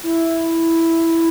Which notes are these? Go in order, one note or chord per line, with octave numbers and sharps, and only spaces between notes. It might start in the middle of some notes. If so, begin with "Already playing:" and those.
E4